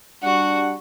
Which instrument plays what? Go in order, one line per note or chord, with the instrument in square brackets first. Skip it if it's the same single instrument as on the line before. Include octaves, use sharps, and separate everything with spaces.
[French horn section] G3 D4 [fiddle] F#4 [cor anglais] F#5